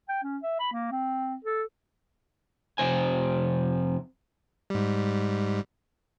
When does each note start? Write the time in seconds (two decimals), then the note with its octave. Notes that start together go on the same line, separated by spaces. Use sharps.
0.08 G5
0.23 C#4
0.42 E5
0.59 B5
0.72 A#3
0.91 C4
1.44 A4
2.78 F2 C3 C5 G#5
4.70 G#2 G3